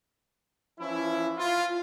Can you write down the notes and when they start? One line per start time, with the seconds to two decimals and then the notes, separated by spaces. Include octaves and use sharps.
0.79 E3 F3 C#4 E4
1.37 F4